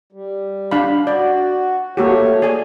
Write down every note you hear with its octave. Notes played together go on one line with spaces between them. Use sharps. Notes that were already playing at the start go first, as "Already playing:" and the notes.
G3
D4 F5 B5
F#4 D5
A3 A#3 F#4 G4 C#5
G#4 D5 G#5